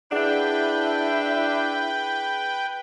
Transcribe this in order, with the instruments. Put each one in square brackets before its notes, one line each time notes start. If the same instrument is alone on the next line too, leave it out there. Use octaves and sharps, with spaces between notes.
[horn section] D4 [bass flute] E4 [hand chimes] G#4 F#5 [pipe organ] B4 G5